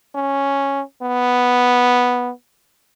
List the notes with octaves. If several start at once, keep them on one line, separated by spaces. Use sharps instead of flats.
C#4
B3